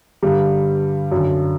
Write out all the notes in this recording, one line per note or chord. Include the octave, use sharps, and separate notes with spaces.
G2 D3 G3
F#2 D3